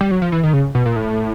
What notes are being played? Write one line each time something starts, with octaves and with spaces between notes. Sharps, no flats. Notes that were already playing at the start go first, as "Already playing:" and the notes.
G3
F#3
F3
E3
D#3
C#3
B2
A#2
A2